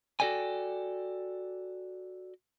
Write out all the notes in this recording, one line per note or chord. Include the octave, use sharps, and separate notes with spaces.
F#4 G4 A4 D5 G5 G#5